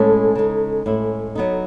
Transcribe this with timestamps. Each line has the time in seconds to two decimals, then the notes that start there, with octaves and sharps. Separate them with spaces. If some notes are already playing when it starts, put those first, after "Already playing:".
Already playing: A2 G#3 C#4 A4
0.35 C#3 G#3 D#4
0.86 A2 G#3 C#4 E4
1.35 F#3 B3 D#4